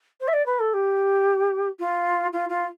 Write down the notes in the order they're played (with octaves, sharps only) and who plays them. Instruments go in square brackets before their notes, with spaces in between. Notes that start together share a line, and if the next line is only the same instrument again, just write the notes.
[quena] C5
E5
D5
B4
A4
G4
F4
F4
F4